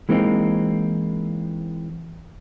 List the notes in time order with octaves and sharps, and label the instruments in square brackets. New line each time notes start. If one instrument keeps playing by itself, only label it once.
[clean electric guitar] E3 G#3 A#3 C4 D#4